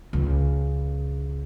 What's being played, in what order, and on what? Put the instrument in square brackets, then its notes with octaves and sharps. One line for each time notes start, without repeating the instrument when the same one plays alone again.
[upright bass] C#2